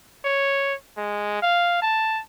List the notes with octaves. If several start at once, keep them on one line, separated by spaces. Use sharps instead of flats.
C#5
G#3
F5
A5